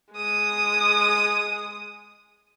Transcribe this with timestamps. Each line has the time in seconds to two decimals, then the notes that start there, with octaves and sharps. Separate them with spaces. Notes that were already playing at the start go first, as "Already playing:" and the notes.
0.13 G#3 D#6